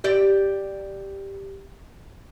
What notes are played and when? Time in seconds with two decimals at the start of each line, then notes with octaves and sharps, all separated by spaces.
0.04 G4 D5 E5